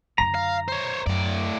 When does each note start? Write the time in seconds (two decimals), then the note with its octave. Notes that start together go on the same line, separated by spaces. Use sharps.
0.18 F#2 D3 A#5
0.35 F5
0.68 C5 C#5
1.06 F#2 A2 D5